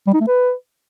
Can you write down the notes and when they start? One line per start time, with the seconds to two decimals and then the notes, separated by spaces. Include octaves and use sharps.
0.07 G3
0.14 D#4
0.20 A3
0.27 B4